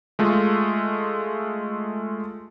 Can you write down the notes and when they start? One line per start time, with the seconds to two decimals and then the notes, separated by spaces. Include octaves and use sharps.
0.19 G#3 A3 F4